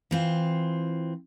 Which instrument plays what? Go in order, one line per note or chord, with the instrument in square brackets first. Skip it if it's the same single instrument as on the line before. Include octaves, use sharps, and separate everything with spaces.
[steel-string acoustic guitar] E3 C4 F4